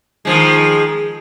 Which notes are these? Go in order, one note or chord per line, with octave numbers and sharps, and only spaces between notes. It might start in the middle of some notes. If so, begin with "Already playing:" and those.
D#3 F3 G#3